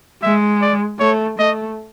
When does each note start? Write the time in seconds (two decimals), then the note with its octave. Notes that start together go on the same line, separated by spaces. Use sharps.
0.23 G#3 E5
0.61 D5
0.99 A3 C#5
1.38 A3 D#5